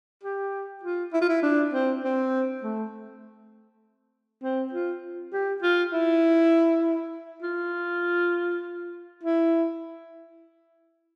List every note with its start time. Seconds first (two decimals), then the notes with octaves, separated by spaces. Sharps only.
0.23 G4
0.83 F4
1.13 E4
1.21 F4
1.29 E4
1.43 D4
1.73 C4
2.04 C4
2.63 A3
4.43 C4
4.73 F4
5.33 G4
5.62 F4
5.93 E4
7.42 F4
9.23 E4